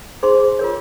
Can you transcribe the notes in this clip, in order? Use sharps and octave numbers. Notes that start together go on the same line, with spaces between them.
D#4 G#4 C5 C6
F4 A#4 C#5